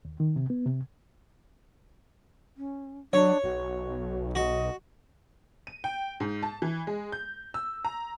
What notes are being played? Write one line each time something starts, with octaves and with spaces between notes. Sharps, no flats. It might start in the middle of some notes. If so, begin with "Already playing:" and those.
D#2
D#3
C3
B3
C3
C#4
F#3 D4 C#5
B1 F#4
F#4 D#5
D#7
G5
G#2
A5
E3
G#3
G6
E6
A#5